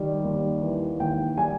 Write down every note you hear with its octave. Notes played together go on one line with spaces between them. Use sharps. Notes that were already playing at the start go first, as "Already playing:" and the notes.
Already playing: D#3 G3
D#2
E3
D#2 G5
G3 G#5